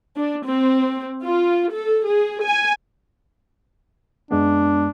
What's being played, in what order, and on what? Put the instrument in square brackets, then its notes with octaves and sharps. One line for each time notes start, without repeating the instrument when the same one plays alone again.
[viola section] D4
C4
F4
A4
G#4
G#5
[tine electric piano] F#2 G#3 B3 [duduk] D4